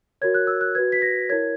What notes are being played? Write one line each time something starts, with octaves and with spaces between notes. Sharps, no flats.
F#4 A#4 C#5 G#6
F#6
E6
F#6
F#4 B4 G#6
B6
A#6
E4 A#4 C#5 G#6